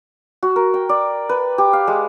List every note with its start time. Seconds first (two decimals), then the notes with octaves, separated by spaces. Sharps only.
0.43 F#4
0.56 A#4
0.74 G5
0.89 D5
1.29 B4
1.58 G4
1.73 F5
1.87 G#3